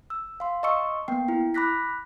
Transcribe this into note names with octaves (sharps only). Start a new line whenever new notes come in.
E6
F5 C6
D#5 A5 C6 C#6 E6 C#7
A#3 B3 G5 C7
E4
B5 D6 F#6 A#6 B6